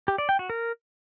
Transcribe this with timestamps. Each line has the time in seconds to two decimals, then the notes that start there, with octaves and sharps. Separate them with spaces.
0.08 G4
0.18 D5
0.29 G5
0.39 F#4
0.50 A#4